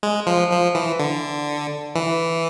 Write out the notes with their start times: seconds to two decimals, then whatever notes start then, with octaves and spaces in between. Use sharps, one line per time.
0.03 G#3
0.27 F3
0.51 F3
0.75 E3
0.99 D3
1.95 E3